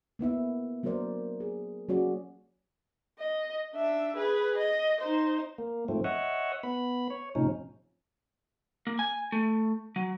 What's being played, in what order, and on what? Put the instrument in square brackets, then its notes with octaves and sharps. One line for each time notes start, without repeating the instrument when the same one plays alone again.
[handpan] A#3 B3 E4 E5
F#3 A#3 D4 A#4 C5 D5
G#4
F#3 A#3 C#4 F#4 G#4 D5
[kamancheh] D#5
D4 E5
G#4 B4
D#5
D#4 C5
[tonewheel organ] A#3
G#2 F3 A3 C4
C#5 D#5 E5 F#5
B3 B5
C#5
A2 C3 F3 C#4 D#4
[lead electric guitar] A#3
G#5
A3
F#3